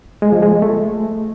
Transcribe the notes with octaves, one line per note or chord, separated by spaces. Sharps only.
G#3
F3
G#3
A3
A3